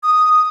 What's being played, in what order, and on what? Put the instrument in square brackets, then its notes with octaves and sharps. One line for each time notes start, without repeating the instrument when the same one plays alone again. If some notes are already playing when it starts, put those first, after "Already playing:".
[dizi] D#6